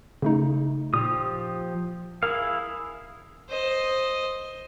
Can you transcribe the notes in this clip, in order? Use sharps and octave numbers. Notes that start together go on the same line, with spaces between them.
C#3 A3 D#4
A#2 F3 G4 D#6
E4 G#4 A#4 F5
C5 D#5